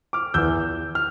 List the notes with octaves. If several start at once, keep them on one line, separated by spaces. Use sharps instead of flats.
D6 F6
E2 E3 E6 G6
F6